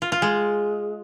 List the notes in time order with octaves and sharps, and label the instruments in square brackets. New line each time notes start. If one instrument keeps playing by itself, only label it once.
[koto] F4
F4
G#3